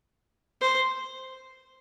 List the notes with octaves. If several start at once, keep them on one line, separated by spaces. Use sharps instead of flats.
C5